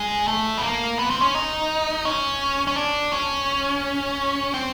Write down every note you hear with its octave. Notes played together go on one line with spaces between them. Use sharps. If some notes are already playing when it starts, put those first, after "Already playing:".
Already playing: G#3
A3
B3
A#3
B3
C4
C#4
D#4
C#4
C#4
D4
C#4
C4